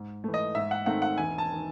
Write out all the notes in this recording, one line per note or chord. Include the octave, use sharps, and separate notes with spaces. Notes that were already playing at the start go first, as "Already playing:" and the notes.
Already playing: G#2
E3 A3
D#5
G#2 E5
F#5
D#3 A3 C4 D#4 F#5
F#5
E1 G#5
A5
D#3